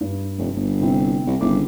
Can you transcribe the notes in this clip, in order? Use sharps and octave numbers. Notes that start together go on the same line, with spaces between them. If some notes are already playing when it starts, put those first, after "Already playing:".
G2
F1
G1
C3 C4 E4
C2
G1 C#3 E4 D6